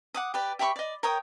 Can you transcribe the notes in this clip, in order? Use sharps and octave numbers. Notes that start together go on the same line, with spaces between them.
F#5 D6 D#6
G4 B4 D5
G4 E5 B5 C#6
D5 D#5
A#4 C#5 G5 D#6